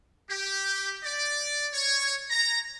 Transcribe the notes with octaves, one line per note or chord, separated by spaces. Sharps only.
G4
D5
C#5
A#5